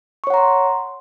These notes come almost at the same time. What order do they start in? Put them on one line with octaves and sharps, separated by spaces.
C#6 C#5 F#5 A#5 C6